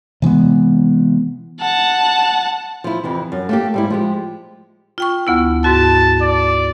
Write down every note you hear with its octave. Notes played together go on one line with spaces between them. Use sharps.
C3 E3 G#3 B3
F#5 A5
F3 E4
F2 C3 E3
F#2
A3 A#3 G4
G#2 G3 E4
F3 G#3 G4
F4 G5 C#6
D2 B3 E4
G#2 F#4 A5
D5